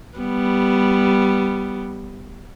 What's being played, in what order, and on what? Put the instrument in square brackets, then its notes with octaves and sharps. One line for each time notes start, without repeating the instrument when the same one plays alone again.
[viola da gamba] G3 B3